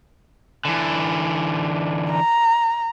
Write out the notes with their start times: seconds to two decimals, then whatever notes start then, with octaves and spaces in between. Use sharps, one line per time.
0.65 D3 E3
2.11 A#5